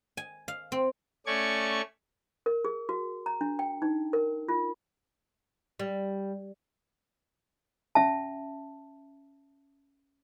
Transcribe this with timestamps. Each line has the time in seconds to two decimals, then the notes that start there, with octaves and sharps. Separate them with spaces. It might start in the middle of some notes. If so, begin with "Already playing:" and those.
0.17 G#5
0.48 F5
0.72 C4
1.26 A3 C#4 D5 C#6 G#6
2.46 A#4
2.65 G#4
2.89 F#4
3.26 A#5
3.41 D4
3.59 G5
3.82 D#4
4.13 A#4
4.49 F4
5.79 G3
7.95 C#4 E5 A5